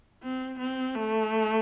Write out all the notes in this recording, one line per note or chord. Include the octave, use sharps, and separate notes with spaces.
C4
C4
A3